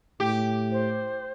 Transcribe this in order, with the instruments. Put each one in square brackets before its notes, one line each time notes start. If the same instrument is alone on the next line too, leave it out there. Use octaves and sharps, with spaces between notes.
[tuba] A2 [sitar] G4
[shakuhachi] C5